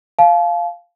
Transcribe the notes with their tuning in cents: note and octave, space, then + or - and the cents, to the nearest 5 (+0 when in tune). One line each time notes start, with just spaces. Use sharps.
F5 +0 A5 -40